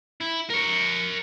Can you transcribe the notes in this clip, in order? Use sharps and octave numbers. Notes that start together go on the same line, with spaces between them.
E4
A#4 C#5